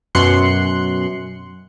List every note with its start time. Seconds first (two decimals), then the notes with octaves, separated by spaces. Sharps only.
0.15 F#2 B2 C6 F#6 C#7